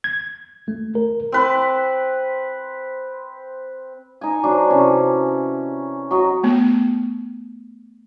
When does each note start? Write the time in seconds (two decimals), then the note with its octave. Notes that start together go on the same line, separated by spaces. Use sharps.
0.04 G#6
0.68 A3
0.95 A#4
1.32 C4 B4
4.21 D#4 G#5
4.43 F#3 D4 C5 D5
4.70 C3 E3 C#4
6.11 F#3 F#4 D#5
6.43 A3 B3